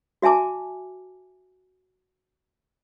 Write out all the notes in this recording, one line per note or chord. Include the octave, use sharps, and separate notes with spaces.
F#4 E5 G#5 A5 D6